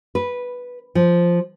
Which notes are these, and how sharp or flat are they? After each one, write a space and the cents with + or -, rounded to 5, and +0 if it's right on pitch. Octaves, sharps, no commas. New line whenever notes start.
B4 -5
F3 -5